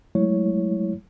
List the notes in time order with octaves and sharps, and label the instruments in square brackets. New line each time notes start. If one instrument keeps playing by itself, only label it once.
[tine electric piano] F#3 G#3 A3 E4 C#5